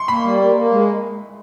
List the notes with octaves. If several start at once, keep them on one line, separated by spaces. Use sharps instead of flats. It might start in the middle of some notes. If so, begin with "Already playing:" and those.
Already playing: C6 C#6
A#3 B5
G3
A#3
A#3
G#3